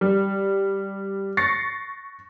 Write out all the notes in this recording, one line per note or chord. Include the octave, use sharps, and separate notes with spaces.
G3
C#6 A6 A#6 C7 C#7